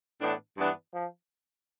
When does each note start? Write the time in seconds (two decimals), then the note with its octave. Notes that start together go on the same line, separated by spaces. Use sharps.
0.21 A2 E3 B3 D4
0.57 G2 E3 B3 D4
0.93 F3